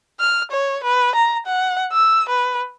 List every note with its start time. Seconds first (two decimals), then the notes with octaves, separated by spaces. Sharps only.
0.20 F6
0.51 C#5
0.84 B4
1.15 A#5
1.46 F#5
1.93 E6
2.29 B4